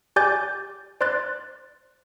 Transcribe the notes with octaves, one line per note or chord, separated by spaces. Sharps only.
G4 D5 G#5 D6 G6 A6
C5 D5 C6 F#6 A6